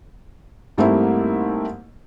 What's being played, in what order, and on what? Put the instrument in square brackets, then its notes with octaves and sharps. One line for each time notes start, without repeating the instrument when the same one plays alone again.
[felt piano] G#2 G3 A3 A#3 C4 E4